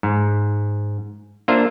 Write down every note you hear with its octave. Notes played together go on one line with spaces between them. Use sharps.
G#2
A#3 D4 F4 C5 E5 A#5